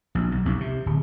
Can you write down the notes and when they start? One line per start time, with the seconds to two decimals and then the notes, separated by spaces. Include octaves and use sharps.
0.15 A#1
0.31 B1
0.45 B1
0.60 C3
0.86 D1